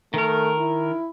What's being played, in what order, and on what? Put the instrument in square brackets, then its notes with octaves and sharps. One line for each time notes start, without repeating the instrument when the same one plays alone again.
[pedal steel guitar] D#3 A#4 [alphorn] A3
[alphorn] E4